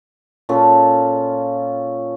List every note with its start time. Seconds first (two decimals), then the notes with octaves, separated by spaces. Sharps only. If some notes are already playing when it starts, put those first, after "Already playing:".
0.49 A#2 C#4 F4 A4